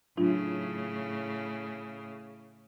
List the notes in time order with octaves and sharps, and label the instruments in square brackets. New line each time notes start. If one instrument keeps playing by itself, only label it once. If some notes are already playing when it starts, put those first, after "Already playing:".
[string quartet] A2 C#3 [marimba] F#3 D4 F4